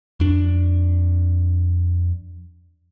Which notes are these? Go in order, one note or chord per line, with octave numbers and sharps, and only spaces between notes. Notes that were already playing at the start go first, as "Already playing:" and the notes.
F2 D4